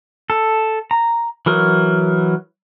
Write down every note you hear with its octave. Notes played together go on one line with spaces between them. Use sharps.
A4
A#5
E3 F#3 A#4